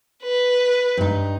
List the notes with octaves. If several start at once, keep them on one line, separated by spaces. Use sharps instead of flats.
B4
G2 D#4